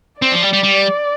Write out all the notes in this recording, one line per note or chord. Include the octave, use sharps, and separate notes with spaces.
C4 D5
F3
G3
G3
G3